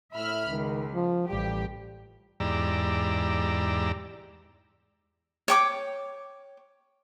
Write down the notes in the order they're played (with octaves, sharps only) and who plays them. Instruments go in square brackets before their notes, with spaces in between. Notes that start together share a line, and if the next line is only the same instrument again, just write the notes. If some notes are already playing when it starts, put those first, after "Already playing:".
[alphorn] A2 [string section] E5 B5 F6
[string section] C#2 [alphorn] D#3
[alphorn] F3
[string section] A1 G4 [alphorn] G3
[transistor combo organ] E2 G#2 G4 D5 A#5 E6
[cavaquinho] C#5 G5 D6